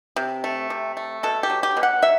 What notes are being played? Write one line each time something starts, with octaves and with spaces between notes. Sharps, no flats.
C3
A3
C3
A3
B2 A4
G4
F#3
G4
B2
F#5
F#3 E5